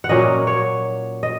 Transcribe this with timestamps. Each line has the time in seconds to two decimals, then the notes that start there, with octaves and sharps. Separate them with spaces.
0.04 F#5
0.09 A#2 F#3 A#3 C#4 D#5
0.47 C#5
1.23 D#5